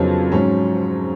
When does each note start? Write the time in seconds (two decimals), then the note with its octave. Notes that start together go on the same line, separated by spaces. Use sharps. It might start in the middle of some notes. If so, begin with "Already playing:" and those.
Already playing: F2 C#3 F#3 B3 D#4 C#5
0.32 G#2 F#3 C#4